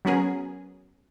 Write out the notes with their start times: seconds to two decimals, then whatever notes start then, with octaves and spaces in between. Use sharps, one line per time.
0.05 F#3 B3 C#4 G#4 A#4